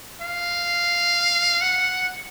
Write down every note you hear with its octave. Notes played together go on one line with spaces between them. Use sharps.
F5
F#5